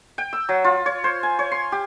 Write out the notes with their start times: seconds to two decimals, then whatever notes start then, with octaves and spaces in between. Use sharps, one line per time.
0.18 G5
0.33 E6
0.49 F#3
0.64 F4
0.86 C#5
1.04 C5
1.23 G#5
1.39 C#5
1.51 C6
1.72 G4